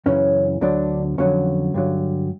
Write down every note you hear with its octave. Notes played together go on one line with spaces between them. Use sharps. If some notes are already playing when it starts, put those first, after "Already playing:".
F#2 C#3 E3 C#4
D2 D3 F#3 D4
F2 D3 F#3 C#4
G2 D3 F#3